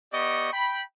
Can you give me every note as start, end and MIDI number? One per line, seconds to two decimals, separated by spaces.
0.13 0.52 59
0.13 0.52 67
0.13 0.52 74
0.13 0.52 75
0.13 0.52 85
0.53 0.82 79
0.53 0.82 83